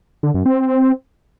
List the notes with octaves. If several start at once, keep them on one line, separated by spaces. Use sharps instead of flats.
D3
F#2
C4